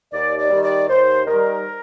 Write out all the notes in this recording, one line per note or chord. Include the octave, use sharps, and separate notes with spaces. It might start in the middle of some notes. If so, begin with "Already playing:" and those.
D#2 D5
D5
D#3 G3
D5
D#2 C5
D#3 G3 A#4